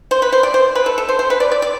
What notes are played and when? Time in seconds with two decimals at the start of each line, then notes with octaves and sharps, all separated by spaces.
0.11 C5
0.22 B4
0.32 C5
0.43 D5
0.54 C5
0.75 B4
0.86 A4
0.98 A4
1.09 C5
1.19 C5
1.30 B4
1.40 D5
1.52 D5
1.62 D5